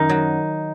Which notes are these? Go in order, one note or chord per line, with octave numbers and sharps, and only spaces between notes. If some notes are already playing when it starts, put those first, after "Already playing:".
Already playing: F#2 D#3 D#4
F#3